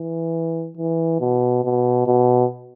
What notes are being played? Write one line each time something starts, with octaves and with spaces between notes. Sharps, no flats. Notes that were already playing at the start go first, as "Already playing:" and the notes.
Already playing: E3
E3
B2
B2
B2